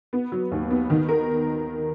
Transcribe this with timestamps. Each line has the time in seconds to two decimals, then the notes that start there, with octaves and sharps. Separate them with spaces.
0.13 B3
0.32 F#3
0.52 D#2
0.70 B3
0.90 D#3
1.09 A#4